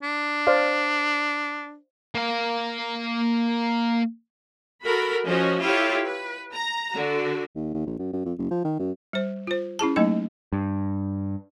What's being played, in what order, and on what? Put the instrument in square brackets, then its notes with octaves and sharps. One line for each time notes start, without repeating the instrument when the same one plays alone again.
[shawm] D4
[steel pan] C5 D5 F5
[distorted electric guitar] A#3 F5
[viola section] F#4 A4 A#4 B5
F3 C#4 F#4 D#5
E4 F4 G4 A4 C#5 F5
B4
A#5
D3 F#4
[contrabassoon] D#2
D#2
A#1
F#2
F#2
F2
F#1
F3
D#3
F#2
[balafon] G3 C5
F4 C5
C#4 E4 G#4 A5
F#3 A3 A#3 D#4 D#5
[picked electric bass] G2